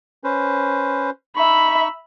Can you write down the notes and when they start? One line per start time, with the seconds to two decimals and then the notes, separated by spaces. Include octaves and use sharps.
0.24 C#4 B4 C5
1.36 D#4 E5 B5 C#6